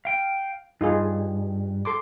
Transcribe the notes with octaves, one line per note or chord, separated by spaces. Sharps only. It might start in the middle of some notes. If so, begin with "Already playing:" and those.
F5 G5
G2 D#4 F4 G#4
A4 C6 D6